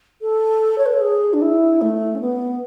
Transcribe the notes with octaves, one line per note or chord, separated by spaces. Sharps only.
A4
C#5
B4
A4
G#4
D4
E4
A3
C#4
B3